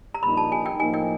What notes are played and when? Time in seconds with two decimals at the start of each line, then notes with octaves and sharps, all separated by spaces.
0.14 A#5
0.23 A#1 A#2 G3 A#3 D#4 B5
0.37 A5
0.52 G#5
0.66 G5
0.79 A2 F3 A#3 D#4 G#5
0.94 G5